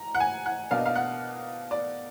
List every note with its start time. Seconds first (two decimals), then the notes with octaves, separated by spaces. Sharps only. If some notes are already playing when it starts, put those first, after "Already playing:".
Already playing: A#5
0.15 F#5
0.20 G#5
0.46 F#5
0.71 B2 A#3 D4 F5
0.78 D#5
0.86 F5
0.96 F#5
1.71 D5